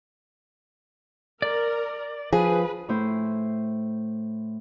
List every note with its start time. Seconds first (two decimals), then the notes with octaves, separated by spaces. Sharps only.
1.42 A#4 D5
2.33 F3 G#4 B4
2.89 A2 E4 C5